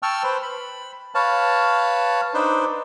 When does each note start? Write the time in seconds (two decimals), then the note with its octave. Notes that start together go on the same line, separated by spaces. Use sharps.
0.03 G5 A5 C#6 E6 F6
0.23 B4 C5
0.43 B5
1.15 B4 C#5 F5 A5
2.34 D4 D#4 B4 C5